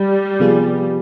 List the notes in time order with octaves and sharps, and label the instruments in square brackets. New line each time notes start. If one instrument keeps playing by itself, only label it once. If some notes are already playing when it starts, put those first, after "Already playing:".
Already playing: [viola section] G3
[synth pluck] C3 F3 B3 F4 G#4